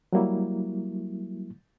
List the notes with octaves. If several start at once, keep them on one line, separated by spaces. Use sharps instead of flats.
F#3 G3 A#3 E4